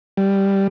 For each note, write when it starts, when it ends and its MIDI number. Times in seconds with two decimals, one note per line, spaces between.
0.17 0.67 55